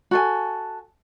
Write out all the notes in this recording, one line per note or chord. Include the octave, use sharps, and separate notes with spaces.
F#4 A4 G#5